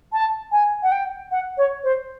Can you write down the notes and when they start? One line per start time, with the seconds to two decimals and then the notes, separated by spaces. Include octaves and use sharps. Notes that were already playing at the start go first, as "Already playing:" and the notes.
0.12 A5
0.51 G#5
0.82 F#5
0.91 G5
1.31 F#5
1.57 C#5
1.83 C5